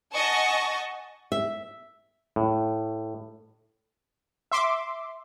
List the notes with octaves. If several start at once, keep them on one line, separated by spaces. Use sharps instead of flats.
D#5 F#5 G#5 A5 C#6
E5
A2
E5 C6 D6